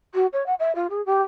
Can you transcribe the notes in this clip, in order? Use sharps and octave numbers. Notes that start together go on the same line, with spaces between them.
F#4
C#5
F#5
E5
F4
G#4
G4